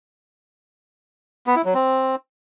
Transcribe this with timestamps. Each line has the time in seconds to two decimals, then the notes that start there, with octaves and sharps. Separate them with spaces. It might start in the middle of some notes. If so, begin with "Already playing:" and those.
1.47 B3
1.56 E4
1.65 F#3
1.74 C4